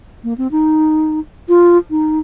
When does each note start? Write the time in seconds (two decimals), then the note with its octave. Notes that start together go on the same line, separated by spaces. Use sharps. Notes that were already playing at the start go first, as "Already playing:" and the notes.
0.24 A#3
0.38 C4
0.51 D#4
1.49 F4
1.90 D#4